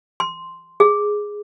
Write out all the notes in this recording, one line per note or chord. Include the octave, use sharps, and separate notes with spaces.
C6
G#4